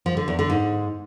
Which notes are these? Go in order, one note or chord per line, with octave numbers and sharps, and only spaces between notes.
F3
D3
E2
D3
G#2